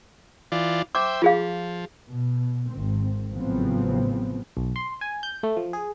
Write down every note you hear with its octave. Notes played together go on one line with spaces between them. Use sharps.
E3 F4 D5
C5 E5 G5 D6
F3 F4 G#4 F5
B2
G#1 C4
A1 C#3 F3 F#3 B3 C4
B1
C6
G#5
G6
A3
F3
G#4